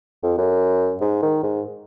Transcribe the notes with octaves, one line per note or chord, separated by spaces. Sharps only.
F2
F#2
G#2
D#3
G#2